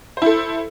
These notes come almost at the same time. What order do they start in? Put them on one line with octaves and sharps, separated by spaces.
C5 E4 A4